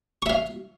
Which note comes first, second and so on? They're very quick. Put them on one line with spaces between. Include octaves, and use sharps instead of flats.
C#6 E5 F5